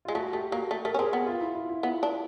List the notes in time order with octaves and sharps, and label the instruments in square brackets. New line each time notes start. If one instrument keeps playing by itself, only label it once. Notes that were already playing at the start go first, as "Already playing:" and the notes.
[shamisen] G#3 [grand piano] F4
[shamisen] A3 [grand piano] F#4
[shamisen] A3 [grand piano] G4
[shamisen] A#3 [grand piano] F#4
[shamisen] A3 [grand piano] G4
[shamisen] A3 [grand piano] A#4
[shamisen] C#4
[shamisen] C4 [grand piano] G#4
[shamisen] B3 [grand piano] G4
[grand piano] F4
E4
F4
E4
[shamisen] B3 [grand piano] F4
[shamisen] D4